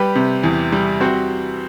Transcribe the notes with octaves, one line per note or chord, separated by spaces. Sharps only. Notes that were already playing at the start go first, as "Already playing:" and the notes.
Already playing: G3 G4 B4
C3
E2
G3
C4 F#4